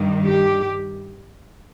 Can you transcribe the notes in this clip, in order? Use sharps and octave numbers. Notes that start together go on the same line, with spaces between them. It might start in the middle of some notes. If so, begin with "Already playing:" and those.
Already playing: G2 D#3 G3
G4